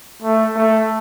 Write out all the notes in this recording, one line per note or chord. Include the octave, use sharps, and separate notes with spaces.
A3
A3